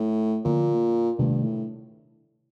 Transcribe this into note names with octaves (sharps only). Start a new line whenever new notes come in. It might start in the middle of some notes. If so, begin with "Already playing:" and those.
Already playing: A2
A#2 D3 F3 A#3
G2 C3 D#3 A3
A2